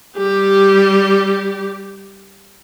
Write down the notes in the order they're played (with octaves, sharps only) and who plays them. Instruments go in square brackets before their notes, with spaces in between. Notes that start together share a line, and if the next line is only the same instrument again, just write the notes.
[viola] G3 G4